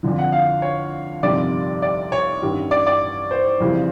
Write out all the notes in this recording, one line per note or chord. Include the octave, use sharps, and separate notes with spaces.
F2 D3 F3
F#5
F5
C#5
G1 F2 C3 D#3 G3 D5
D5
C#5
A1 G2 D#3 G3
D5
D5
C5
F2 C#3 E3 G3